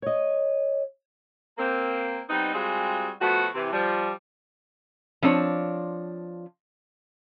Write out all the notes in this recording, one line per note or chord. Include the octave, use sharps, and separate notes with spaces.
C#5 D#5
A#3 C4
G3 B3 C4 D#4
G3 G#3 C4 F4 F#4 G#4
F3 A3 B3 F#4
C3 E3
F3 G3
F3 C4 D4 C#5